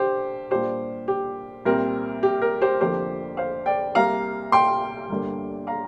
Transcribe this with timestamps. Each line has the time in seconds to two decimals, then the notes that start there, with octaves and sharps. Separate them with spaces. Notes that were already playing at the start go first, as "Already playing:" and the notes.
Already playing: D3 G4 C5
0.50 A#2 G3 D4 F4 G4 C5
1.08 G4
1.65 C2 A#2 G3 C4 A#4
2.23 G4
2.42 A#4
2.61 G4 C5
2.81 F1 F2 D3 F3 A#3 G4 C5
3.37 C5 F5
3.66 D5 G5
3.95 C2 C3 A#3 F5 A#5
4.52 G5 C6
5.09 G1 G2 D3 A#3
5.67 F5 A#5